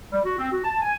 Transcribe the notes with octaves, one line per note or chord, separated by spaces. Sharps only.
G3
F#4
C4
F#4
A5
G#5